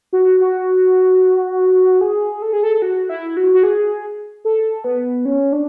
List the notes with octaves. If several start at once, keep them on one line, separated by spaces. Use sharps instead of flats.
F#4
F#4
G#4
A4
G#4
A4
F#4
E4
F#4
F#4
G#4
A4
B3
C#4
D4